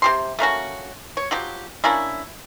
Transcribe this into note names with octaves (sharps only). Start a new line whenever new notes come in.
C3 G4 C6
A3 A#3 C#4 F#4
C#5
F3 F#3 G4
A#3 C#4 D4 E4